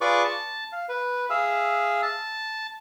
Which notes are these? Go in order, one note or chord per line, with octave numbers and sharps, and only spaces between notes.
F4 G#4 B4 D5 C#6 D6
A5
F5
B4
G#4 E5 F5
A5